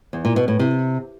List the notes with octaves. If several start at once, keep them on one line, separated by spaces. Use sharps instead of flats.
E2
A#2
B2
A2
C3